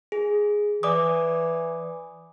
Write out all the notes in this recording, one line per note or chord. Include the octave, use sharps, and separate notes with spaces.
G#4
E3 D5 D6 D#6